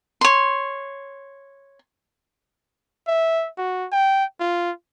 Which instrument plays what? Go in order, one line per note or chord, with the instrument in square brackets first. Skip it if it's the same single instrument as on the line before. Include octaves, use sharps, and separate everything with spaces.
[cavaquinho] C#5 C6
[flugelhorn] E5
F#4
G5
F4